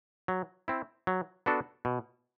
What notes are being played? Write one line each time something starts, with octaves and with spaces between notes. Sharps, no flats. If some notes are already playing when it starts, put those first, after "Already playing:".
F#3
C4 E4
F#3
B3 D4 F#4 A4
B2